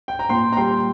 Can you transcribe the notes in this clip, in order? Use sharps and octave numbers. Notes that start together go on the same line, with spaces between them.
G5
A#5
A#2 G5 C6
A#5
G3 G5 C6